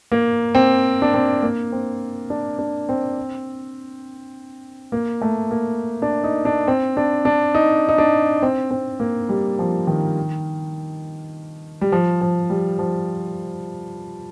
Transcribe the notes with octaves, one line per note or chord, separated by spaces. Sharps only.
A#3
C4
D4
C4
A#3
C4
D4
D4
C4
A#3
A3
A#3
D4
D#4
D4
C4
D4
D4
D#4
D#4
D4
C4
C4
A#3
G3
F3
D#3
G3
F3
F3
G3
F3